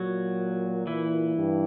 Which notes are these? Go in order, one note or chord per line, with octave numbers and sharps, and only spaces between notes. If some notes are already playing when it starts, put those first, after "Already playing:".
Already playing: A#2 F#3 F#4
E3 E4
G2